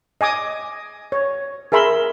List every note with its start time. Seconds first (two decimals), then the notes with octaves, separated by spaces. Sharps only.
0.21 D#5 G#5 D6 D#6
1.12 C#5
1.72 G#4 A#4 E5 B5 C6